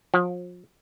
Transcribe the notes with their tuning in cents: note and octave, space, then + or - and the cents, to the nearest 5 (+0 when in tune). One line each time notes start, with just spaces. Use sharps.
F3 +35